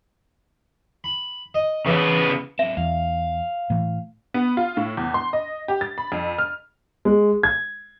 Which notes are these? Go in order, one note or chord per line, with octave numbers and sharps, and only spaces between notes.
B5
D#5
C#3 E3 B3 D5
F#3 C4 E5
E2 F5
A2 E3 A3
B3
F4
A2
E2
C6
D#5
G4
A6
B5
F2
F6
G#3
G#6